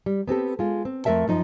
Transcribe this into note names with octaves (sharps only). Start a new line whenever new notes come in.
G3
B3 C4 G4 A4
G#3 F4
C4
F2 A3 A#4 E5 A5
F#2 F3 D#4